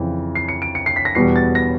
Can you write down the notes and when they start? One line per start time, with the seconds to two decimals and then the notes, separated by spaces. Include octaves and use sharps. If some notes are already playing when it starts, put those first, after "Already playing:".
Already playing: F2 C#3 E3
0.35 C7
0.49 C#7
0.62 D7
0.75 C#7
0.86 C7
0.96 B6
1.05 A#6
1.15 E2 B2 G3 B3 C7
1.36 A6
1.55 A#6